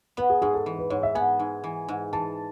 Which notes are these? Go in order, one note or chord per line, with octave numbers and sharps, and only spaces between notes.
B3 B4
G#4
G#2 G#4
A4
E3
B4
G#2 C#5
E5
B3 G#5
G#2
E3
G#2
E3 A5